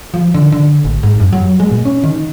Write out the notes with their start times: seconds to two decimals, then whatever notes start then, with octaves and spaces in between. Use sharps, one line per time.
0.14 F3
0.34 D3
0.52 D3
0.84 A1
1.03 G#2
1.20 F#2
1.33 F#3
1.60 G#3
1.71 A#2
1.85 C#4
2.04 D#3